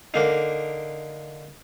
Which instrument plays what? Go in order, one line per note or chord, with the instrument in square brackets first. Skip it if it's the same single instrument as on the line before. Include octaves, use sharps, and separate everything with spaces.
[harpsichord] D3 A#3 D#4